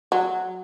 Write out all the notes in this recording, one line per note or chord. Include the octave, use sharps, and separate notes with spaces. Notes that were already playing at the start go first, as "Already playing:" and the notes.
F#3